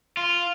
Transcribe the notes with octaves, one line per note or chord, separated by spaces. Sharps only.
F4